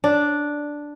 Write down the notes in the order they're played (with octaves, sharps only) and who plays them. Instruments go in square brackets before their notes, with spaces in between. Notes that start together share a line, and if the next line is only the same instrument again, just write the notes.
[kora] D4